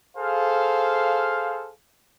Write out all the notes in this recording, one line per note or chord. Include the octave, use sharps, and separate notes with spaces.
G#4 A4 C5 F5